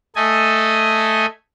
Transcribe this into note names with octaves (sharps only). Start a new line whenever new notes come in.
A3 A4 D#5 G#5